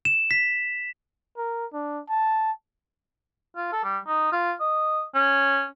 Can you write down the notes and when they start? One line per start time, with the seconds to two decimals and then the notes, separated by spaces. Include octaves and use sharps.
0.05 E7
0.31 B6
1.37 A#4
1.73 D4
2.09 A5
3.56 F4
3.73 A4
3.84 G3
4.07 D#4
4.32 F4
4.60 D#5
5.15 C#4